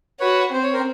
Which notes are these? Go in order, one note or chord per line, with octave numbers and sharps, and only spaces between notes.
F#4 B4 C#5
C4 C5
C#5
A#4 C5